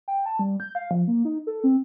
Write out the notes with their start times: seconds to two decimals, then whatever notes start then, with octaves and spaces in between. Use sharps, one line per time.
0.08 G5
0.26 A5
0.39 G3
0.60 G6
0.75 F5
0.91 F3
1.08 A#3
1.25 D#4
1.47 A4
1.64 C4